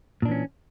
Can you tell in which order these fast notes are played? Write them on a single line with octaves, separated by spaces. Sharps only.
A#2 D4 E3 C#4